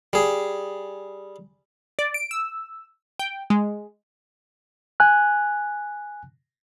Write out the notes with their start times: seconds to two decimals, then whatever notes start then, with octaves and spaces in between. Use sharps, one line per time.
0.13 G3 G#4
1.99 D5
2.14 D7
2.31 E6
3.19 G5
3.50 G#3
5.00 G#5 F#6